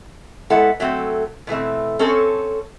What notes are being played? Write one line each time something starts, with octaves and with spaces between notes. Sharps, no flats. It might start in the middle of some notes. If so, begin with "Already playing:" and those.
G#3 B3 E4 A4 F#5
F#3 A3 C4
B2 E3 A3 C4
C4 C#4 A4 C#5